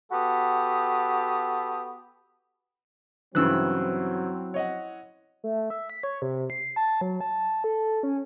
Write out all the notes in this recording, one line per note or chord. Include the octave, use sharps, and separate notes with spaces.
B3 F#4 G4 A4 B5 D#6
G2 C#3 E3 F#3 C4 E4 E6 F#6
C#5 D#5 F#5
A3
E5
B6
C#5
C3
C7
A5
F#3
A5
A4
C#4